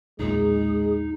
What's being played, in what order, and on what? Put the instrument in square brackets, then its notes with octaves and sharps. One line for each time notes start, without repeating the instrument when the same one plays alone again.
[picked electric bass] B1 E2 A#2 [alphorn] G#3 [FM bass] D#4 [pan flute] G#4